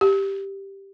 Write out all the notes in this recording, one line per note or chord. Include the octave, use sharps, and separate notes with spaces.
G4